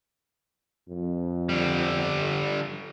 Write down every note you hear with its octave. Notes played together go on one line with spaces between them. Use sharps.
F2
D3 G3